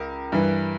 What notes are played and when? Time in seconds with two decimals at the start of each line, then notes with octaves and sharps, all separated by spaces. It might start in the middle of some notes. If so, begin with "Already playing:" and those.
Already playing: C#2 A#4
0.32 G2 E3